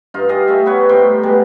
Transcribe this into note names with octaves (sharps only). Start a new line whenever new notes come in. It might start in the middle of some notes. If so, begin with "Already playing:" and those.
G2 D#4 F4
G4 G#4 D#5 F5
A3 D#4 E5
B3 B4 C#5
A2 G3 C5 G5
B2 G3 G#3